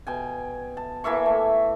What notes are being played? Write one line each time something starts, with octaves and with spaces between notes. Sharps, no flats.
B2 G5 G#5
A5
E3 A#3 E5 C#6
A3